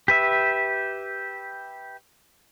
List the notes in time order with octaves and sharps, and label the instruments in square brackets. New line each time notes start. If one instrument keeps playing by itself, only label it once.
[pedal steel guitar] G4 B4 E5